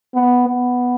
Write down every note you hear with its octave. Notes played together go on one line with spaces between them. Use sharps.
B3
B3